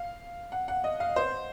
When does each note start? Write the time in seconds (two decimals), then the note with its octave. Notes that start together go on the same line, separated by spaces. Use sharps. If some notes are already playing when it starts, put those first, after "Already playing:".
Already playing: F5
0.52 F#5
0.68 F#5
0.84 D#5
1.00 F5
1.16 C5